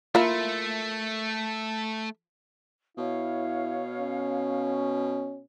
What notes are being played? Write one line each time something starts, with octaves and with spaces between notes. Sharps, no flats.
A3 A#3 E4 F4
B2 E4 C#5 F5
C#4